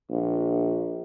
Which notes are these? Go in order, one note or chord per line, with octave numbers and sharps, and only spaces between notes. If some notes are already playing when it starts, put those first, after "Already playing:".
A#1